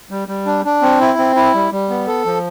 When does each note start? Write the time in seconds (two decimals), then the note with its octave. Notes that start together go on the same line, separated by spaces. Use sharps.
0.11 G3
0.28 G3
0.46 D4
0.65 D4
0.82 C4
1.01 E4
1.18 C4
1.36 E4
1.54 G3
1.72 G3
1.89 B3
2.07 A4
2.26 F3